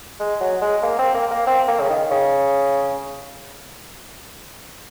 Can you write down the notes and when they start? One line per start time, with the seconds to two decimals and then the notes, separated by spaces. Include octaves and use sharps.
0.19 G#3
0.41 F#3
0.61 G#3
0.83 A#3
0.99 C4
1.15 A#3
1.31 A#3
1.47 C4
1.68 A#3
1.80 C#3
1.89 D#3
2.11 C#3